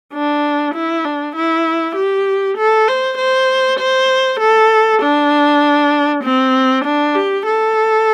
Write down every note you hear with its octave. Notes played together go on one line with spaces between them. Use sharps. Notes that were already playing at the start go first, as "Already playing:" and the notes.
D4
E4
D4
E4
G4
A4
C5
C5
C5
A4
D4
C4
D4
G4
A4